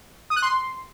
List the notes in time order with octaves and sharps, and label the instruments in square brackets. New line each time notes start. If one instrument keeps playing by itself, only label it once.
[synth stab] D#6
F#6
C6